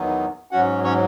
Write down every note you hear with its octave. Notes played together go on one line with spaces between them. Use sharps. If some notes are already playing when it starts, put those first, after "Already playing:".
Already playing: E2 D#3 F#3 B3 D#4
G#2 F#3 C#4 F#4 F#5
C#4 C#5